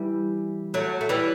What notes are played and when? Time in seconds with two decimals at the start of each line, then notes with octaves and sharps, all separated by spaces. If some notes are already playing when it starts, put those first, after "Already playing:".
Already playing: E3 G3
0.74 F#3 A3
1.01 A3
1.09 E3 G3